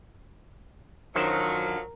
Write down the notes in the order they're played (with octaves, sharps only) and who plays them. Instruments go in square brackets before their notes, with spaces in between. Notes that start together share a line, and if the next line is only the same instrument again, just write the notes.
[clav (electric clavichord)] F#2 D#3 C5 [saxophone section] D3 F3 F#3 [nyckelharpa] A#4